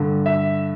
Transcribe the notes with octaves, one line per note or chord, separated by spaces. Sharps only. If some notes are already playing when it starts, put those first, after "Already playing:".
Already playing: G2 D3
E5